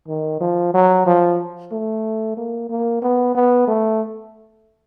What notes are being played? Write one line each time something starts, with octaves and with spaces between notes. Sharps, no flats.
D#3
F3
F#3
F3
A3
A#3
A#3
B3
B3
A3